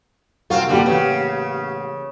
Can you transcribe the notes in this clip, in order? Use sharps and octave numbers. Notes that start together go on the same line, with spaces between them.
C2 C4 F4 F#4 A#4 F5
D3 G3 A#3 G4
A1 C#3 B3